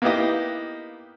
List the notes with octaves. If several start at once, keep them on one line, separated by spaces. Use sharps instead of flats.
A#3 B3 D#4 E4 G4 D#5